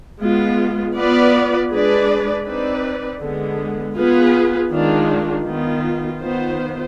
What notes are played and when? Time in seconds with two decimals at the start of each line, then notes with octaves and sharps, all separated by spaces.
0.22 G#3 B3 F4
0.96 B3 F4 B4 D5
1.71 G#3 D4 G#4 B4 D5
2.46 C4 D#4 B4 D5
3.22 D3 G#3 B3
3.97 B3 F4 G#4 B4
4.71 D#3 G#3 D4 F4
5.46 D#3 B3 F4
6.22 D#3 B3 F4 C5